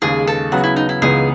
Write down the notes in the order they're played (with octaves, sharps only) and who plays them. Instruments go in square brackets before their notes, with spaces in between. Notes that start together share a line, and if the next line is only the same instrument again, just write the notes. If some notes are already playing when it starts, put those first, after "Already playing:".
[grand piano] D#2 C#3 G#3 [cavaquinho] G#4
[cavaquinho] A4
[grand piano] C#3 F#3 B3 [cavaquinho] F#4
[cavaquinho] E4
D#4
E4
[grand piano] C#2 C#3 E3 B3 D#4 [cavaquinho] G#4